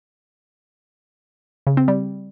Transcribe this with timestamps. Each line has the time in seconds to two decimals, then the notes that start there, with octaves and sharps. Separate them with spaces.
1.67 C#3
1.77 C4
1.88 G3